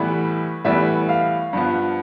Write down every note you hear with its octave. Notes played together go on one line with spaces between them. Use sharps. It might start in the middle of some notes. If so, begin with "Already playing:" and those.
Already playing: A2 E3 G3 B3 E5
A2 E3 G3 B3 E5
F5
G2 F3 B3